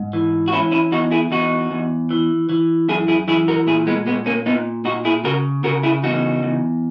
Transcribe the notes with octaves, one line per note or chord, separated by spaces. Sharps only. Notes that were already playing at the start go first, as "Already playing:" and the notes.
Already playing: G#2
E3
F#4
E3 C#4 E4
C#4 E4
E2 D#4 F#4
E4 G#4
E2 D#4 F#4
E2
E3
E3
F#2 E4 G#4
E4 G#4
E3 E4 G#4
F#4 A#4
A#2 E4 G#4
G#3 B3
A#2 G#3 B3
A#3 C#4
A#2 B3 D#4
A#2 D#4 F#4
E4 G#4
C#3 F#4 A#4
C#3 F#4 A#4
E4 G#4
E2 D#4 F#4
E2